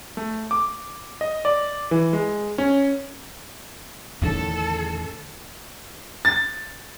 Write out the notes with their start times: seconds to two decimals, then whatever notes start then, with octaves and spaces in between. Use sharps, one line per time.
0.17 A3
0.51 D6
1.21 D#5
1.45 D5
1.91 E3
2.13 G#3
2.58 C#4
4.22 E2 A2 D3 D#3 C#4 A4
6.25 A6